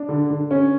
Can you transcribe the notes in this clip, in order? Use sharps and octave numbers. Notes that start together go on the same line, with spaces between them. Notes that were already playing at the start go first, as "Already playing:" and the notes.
Already playing: D4
D3
D3
C#4